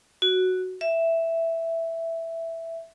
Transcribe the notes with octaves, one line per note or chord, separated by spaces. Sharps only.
F#4
E5